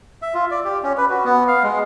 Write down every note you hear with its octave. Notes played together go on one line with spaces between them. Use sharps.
E5
F4
D5
G4
C#4
B4
F#4
B3
F5
G#3